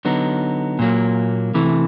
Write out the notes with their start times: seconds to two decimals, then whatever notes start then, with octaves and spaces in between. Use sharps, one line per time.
0.05 D3 F#3 B3 D#4
0.79 A#2 F#3 A#3
1.54 C3 E3 A3